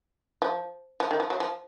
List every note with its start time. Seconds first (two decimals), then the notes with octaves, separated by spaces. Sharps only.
0.42 F3
1.00 F3
1.11 D#3
1.20 F3
1.30 F#3
1.40 F3